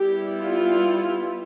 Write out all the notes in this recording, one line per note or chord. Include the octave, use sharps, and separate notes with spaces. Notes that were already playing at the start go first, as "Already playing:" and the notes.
Already playing: G3 B3 E4 G4
F4